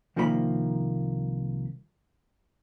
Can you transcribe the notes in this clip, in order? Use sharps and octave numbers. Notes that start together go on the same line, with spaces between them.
C2 D#3 F3 A#3 A#4 B5